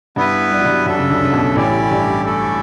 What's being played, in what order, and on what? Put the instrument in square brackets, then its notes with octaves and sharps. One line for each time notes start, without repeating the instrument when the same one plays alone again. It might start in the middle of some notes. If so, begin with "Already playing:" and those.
[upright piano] G2 G3 [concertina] B3 E4 B4
[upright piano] G3
F#3
G2 G3
[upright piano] F#2 F#3 [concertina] D4 A4 E5
[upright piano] C#3
D2 D3
C#3
B1 B2
[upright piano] A1 A2 [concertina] C#4 E4 G4 D5
[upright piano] G2
[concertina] A3 C#4 E4 A4 D5